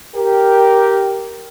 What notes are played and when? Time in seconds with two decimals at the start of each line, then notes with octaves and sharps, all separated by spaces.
0.16 G4 A#4